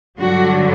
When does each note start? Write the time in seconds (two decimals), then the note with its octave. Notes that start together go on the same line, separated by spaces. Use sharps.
0.19 G2 D3 F#3 F#4